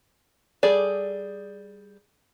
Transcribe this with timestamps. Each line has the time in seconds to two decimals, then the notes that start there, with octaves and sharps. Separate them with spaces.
0.63 G3 G#4 A4 D5